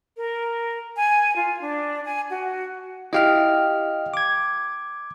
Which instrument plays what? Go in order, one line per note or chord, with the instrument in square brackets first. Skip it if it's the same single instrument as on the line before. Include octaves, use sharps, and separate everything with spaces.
[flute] A#4
G#5
F4
D4
G#5
F#4
[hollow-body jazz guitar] E4 G4 [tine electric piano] D#5 F5 F6
[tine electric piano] D6 G#6